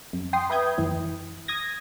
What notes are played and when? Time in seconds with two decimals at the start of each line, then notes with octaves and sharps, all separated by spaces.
0.13 F#2
0.33 G5 C6 D#6
0.50 B4 E5 G5 D#6 G6 G#6
0.78 F#2 E3 E4
1.48 D#6 G#6 A#6